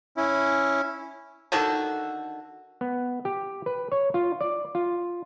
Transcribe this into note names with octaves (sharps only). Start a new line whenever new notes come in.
C#4 E4
D3 D#3 F#4 A4
B3
G4
B4
C#5
F4
D5
F4